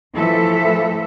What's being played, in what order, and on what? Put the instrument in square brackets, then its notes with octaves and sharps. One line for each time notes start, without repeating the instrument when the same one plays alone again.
[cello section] E3 F3 A3 A4 E5